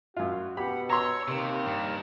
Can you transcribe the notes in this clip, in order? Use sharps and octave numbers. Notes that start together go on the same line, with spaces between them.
F#2 F4 F#4
B2 G4 F#5 B5
C#5 A#5 C6 E6
D#2 C3
G2 A#4